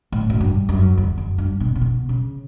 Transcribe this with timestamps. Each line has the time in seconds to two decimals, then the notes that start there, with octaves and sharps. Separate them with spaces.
0.12 A2
0.30 F#2
0.40 G2
0.69 F#2
0.97 E2
1.18 F#2
1.38 G2
1.60 B2
1.75 C#3
1.81 B2
2.09 C#3